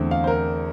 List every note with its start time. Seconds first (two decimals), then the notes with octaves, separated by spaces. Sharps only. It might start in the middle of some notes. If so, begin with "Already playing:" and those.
Already playing: E2 D3 A3 C4
0.11 F5
0.24 C5
0.27 A#4